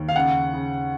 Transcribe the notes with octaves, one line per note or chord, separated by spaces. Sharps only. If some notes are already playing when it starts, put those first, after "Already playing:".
Already playing: D#2
F5
C#3 F#5
C#3